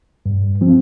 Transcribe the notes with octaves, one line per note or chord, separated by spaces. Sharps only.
G2
F3 C4